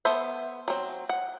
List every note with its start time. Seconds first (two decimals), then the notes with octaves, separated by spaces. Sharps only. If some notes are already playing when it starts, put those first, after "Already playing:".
0.05 B3 A4 C5 E5
0.68 F#3 C4
1.09 F#5